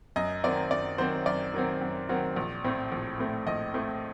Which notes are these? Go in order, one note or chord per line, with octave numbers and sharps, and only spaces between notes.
F#2 D#5
D#3 F#3 C4 D5
F#2 D5
D#3 F#3 C4 C5
F#2 D5
D#3 F#3 C4
F#2
D#3 F#3 C4
A#1
A2 A3 C4
A#1
A2 A3 C4
A#1 D#5
A2 A3 C4